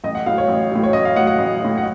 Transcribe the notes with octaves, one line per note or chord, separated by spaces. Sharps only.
A1 D#5
F#5
A2 F#3 F5
C#5
A1
A2 F#3
C#5
A1 D#5
F5
A2 F#3 F#5
F#5
A1
A2 F#3
F#5